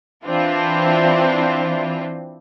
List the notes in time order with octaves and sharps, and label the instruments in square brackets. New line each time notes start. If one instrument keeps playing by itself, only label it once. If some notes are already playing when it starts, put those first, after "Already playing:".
[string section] E3 C4 D4 E4 F4